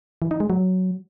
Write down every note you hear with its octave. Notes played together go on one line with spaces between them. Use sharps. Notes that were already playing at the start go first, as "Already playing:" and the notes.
E3
D#4
G#3
F#3